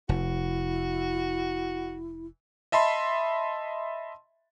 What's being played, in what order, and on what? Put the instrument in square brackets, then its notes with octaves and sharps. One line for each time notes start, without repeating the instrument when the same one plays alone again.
[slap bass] F1 [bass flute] E4 [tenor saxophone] F#4
[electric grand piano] D#5 E5 A5 B5 C6